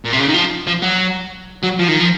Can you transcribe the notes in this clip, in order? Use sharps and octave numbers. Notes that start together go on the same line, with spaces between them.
A#2
C3
C#3
D#3
F3
F3
F#3
F#3
F3
D#3
F3